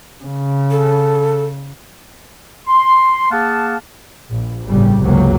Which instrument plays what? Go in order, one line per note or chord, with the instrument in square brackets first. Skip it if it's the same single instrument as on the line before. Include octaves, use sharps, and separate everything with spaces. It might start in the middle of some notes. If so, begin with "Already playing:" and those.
[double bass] C#3
[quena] A4
[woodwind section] C6
A#3 G#4 F5 F#5 A5
[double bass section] A#1
G1 A2 C#3 G3
G1 C#2 C3 F#3 A#3